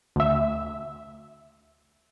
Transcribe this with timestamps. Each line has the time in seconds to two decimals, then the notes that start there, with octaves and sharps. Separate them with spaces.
0.16 D2 E5